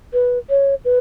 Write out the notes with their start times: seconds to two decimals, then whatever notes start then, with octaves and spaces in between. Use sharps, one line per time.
0.13 B4
0.50 C#5
0.85 B4